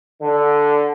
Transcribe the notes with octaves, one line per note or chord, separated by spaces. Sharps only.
D3